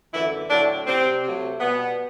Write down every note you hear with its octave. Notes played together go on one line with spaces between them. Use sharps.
F#2 D3 E3 A3 E4
A2 D3 F#3 A3 D4
C3 G3 C4
C3 F#3 A3
B2 G3 B3